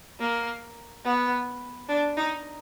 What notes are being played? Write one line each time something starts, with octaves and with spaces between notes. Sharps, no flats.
A#3
B3
D4
D#4